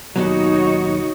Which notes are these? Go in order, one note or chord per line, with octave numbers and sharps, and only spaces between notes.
D#2 B2 F#3 D#4 F#4 C#5